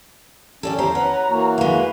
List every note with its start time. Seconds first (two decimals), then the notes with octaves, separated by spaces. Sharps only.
0.63 C#4 A4 D5 G5
0.78 E2 G4 C5 A#5
0.95 C#4 B4 F#5
1.29 E3 A#3 F#4
1.58 G#3 B4 F5